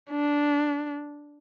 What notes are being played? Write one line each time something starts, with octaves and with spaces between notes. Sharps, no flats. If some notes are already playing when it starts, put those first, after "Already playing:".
D4